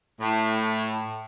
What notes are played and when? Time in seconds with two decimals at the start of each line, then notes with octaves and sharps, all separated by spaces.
0.21 A2